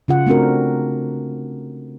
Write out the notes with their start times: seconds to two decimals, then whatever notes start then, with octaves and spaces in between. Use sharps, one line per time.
0.08 C#3 F4 F#5
0.26 A3 C4 D4 F#4 A#4